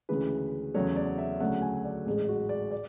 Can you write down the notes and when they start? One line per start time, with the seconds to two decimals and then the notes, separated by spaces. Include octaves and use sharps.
0.09 D2 C#3 E3 G#3 B4
0.74 E2 C#3 F#3 A3 C#5
0.96 D5
1.18 E5
1.40 D2 C#3 F#3 A3 F#5
1.62 G#5
1.84 D5
2.06 A1 G#2 G#3 G#4
2.28 F#4
2.49 D5
2.71 D5